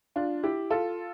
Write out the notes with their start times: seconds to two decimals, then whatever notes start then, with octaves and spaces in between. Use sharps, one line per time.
0.16 D4 F4
0.43 E4 G4
0.70 F4 A4